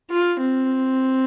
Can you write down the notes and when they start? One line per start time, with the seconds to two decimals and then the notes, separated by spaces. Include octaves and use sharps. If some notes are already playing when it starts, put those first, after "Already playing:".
0.11 F4
0.41 C4